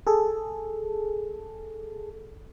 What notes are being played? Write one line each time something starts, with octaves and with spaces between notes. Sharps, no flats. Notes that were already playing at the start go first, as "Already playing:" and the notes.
G#4 A4